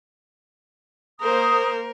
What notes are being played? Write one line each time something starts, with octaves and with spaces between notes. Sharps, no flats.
A#3 A#4 C5 D#6